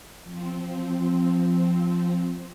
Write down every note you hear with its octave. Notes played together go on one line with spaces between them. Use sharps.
F3 C4